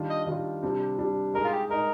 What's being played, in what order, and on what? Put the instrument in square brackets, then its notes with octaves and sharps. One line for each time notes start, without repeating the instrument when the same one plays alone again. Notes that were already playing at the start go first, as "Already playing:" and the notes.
Already playing: [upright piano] D#3 G3 D4 F4
[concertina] D#5
[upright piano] D#3 G3 D4 F4
C3 G3 D4
C3 G3 D4
[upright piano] G#3 D#4 G#4 [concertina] A#4
[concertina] F4
G4
[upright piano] G#3 D#4 G#4 [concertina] A#4